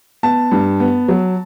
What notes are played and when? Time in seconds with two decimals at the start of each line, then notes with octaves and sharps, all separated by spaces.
0.23 B3 A5
0.51 G2
0.80 B3
1.08 F#3